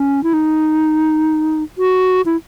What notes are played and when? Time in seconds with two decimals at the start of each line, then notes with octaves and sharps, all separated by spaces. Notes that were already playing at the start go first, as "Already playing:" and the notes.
Already playing: C#4
0.23 E4
0.33 D#4
1.78 F#4
2.26 E4